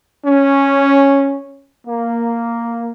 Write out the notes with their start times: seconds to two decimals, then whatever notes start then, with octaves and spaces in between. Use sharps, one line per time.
0.25 C#4
1.87 A#3